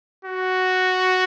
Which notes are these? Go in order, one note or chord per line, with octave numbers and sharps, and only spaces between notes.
F#4